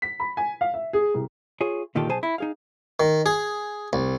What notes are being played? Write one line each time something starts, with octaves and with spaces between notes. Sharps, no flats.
B6
B5
G#5
F5
E5
G#4
C2
F4 G#4 C#5
D2 A#2 D#3 F4 G4 A4
B1 G#4 C5 G#5 A5
E4
D#4 G#4 F5
D#3
G#4
C2